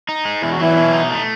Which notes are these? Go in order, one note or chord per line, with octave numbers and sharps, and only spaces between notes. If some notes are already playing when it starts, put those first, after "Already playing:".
D#4
G#3
E2 E4
F#4
E3 F#3 E4
B2
D#4
A3